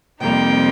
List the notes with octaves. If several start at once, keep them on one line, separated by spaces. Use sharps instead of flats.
F2 C3 G3 A#3 D#4 G5